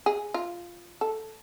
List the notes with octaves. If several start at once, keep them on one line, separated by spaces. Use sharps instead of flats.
G#4
F4
A4